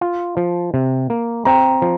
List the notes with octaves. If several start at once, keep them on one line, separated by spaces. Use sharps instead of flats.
F4
F3
C3
A#3
C4 G5 A#5
F3